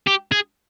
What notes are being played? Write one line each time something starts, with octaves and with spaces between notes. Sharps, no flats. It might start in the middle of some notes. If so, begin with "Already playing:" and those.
G4
G#4